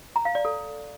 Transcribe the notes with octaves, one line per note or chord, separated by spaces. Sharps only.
A#5
F5
D5
A4